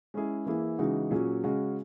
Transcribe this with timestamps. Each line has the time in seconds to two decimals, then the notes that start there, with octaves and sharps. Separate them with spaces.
0.14 G#3 C#4 E4 G#4
0.46 E3 A#3 E4 G#4
0.79 C#3 E3 G#3 D#4 F#4
1.11 A#2 F#3 C#4 G#4
1.44 C#3 G#3 C#4 F#4